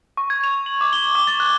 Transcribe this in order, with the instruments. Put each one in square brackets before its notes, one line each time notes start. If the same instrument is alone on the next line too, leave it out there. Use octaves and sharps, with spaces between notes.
[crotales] C#6
G#6
F7
F#7
D6
G7
D6
A6
F#6